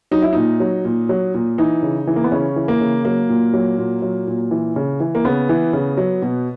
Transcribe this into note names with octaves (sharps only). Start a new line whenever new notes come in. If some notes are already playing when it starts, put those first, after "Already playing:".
F#3 D#4
E4
A#2 D#4
F#3
A#2
F#3
A#2
E3 D#4
C#3
E3
A#3
B3
C#3 C#4
E3
A#3
C#3
F#3 A#3
A#2
F#3
A#2
F#3
A#2
E3
C#3
E3
A#3
C#3 B3
E3
C#3
F#3
B2